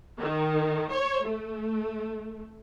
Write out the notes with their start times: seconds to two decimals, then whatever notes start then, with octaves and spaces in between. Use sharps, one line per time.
0.20 D#3
0.93 C#5
1.25 A3